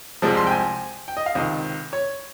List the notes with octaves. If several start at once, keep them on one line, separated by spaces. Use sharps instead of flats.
C2 C3 F3 G#3
C6
G5
G#5
G5
D#5
F5
C#2 C3 D#3 D#5
C#5